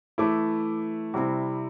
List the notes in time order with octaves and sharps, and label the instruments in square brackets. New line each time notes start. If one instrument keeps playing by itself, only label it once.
[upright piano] E3 A3 E4 D6
C3 G3 C4 E4